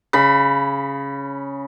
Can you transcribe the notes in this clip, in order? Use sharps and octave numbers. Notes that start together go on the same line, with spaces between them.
C#3 B5